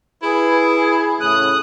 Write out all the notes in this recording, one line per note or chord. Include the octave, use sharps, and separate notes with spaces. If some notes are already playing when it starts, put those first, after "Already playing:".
E4 G#4 B4
A2 C#3 D#6 F#6